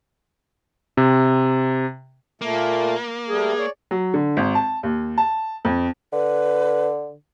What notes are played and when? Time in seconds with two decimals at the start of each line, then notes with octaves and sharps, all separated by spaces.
0.97 C3
2.41 A#2 A3 A#3
3.29 G3 A3 G#4
3.58 C#5 D5
3.91 F#3
4.14 D3
4.37 G#1
4.55 A5
4.83 D#2
5.18 A5
5.65 F2
6.13 D3 B4